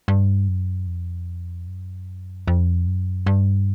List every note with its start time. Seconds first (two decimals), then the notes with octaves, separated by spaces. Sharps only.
0.08 G2
0.48 F#2
0.87 F2
1.67 F#2
2.48 F2
2.87 F#2
3.26 G2